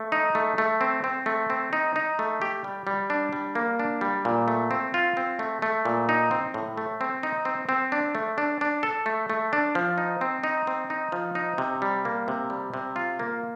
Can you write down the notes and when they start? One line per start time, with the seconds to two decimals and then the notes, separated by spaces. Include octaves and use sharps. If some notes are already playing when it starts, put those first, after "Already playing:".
Already playing: A3
0.12 D#4
0.35 A3
0.58 A3
0.81 C4
1.04 C4
1.26 A3
1.50 C4
1.73 D#4
1.96 D#4
2.19 A3
2.42 G4
2.64 G3
2.87 G3
3.10 D4
3.33 G3
3.55 A#3
3.79 D4
4.01 G3
4.25 A#2
4.48 A3
4.71 C4
4.94 F4
5.17 C4
5.39 A3
5.62 A3
5.85 A#2
6.09 D#4
6.31 C4
6.54 A2
6.77 A3
7.01 C4
7.23 D#4
7.45 C4
7.69 C4
7.92 D4
8.15 A3
8.38 D4
8.61 D4
8.83 A4
9.06 A3
9.30 A3
9.53 D4
9.75 F3
9.98 D#4
10.21 C4
10.44 D#4
10.67 C4
10.90 D#4
11.12 F3
11.35 D#4
11.58 C3
11.82 G3
12.05 A#3
12.28 C3
12.50 G3
12.74 C3
12.96 F4
13.19 A#3